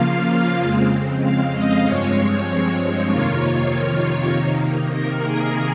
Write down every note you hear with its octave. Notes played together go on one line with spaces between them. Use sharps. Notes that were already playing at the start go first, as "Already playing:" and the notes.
Already playing: C#3 F3 A#3 F4 F5
F2 C#3 G#3 C4
F5
D#5
G2 F3 G#3 C4 C#5
F2 C3 D#3 A#3 F4 C#5
C3 D#3 A#3 D#4
A#4
G#4